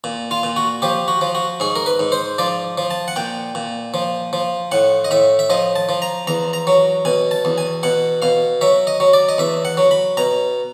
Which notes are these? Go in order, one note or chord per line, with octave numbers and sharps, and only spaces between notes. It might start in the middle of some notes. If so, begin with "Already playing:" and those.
A#2
F4
A#2
F#4
F3 G4
F#4
F3
F#4
G#2 G#4
A#4
B4
G#2
C5
F3 D5
F3
A5
F#5
A#2 G5
A#2
F3
F3
A2 F#5
D#5
A2 E5
E5
F3 D#5
A5
F3
A#5
E2 A#5
A#5
F#3
B2 G#5
A5
E2
G#5
B2 F#5
B2 F5
F#3 E5
D#5
F#3
D5
D#5
E2 E5
F#5
F#3
B5
B2 A#5